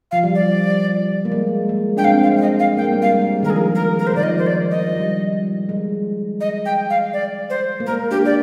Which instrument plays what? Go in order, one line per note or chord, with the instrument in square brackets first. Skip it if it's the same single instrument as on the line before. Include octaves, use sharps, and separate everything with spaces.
[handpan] F3 [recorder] F5
[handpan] G3
[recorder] D5
[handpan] A#3
G#3
G#3
[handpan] D4 [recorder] G5
[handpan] G#3 C4 [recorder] F5
[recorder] F5
F5
D#5
F5
[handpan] A#3 [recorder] G5
[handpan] G#3
G3 A#3
[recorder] F5
[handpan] G#3
[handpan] D#3 [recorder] A#4
[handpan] F3 [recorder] G#4
[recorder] A#4
A#4
C5
[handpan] D#3 [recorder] D5
[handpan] F3 [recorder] D#5
[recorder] C5
D5
D#5
[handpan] G3
G#3
[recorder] D#5
G5
F5
D5
C5
[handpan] A#3
[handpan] G#3 [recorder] A#4
[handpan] A#3 D4 [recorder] G4
[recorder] D5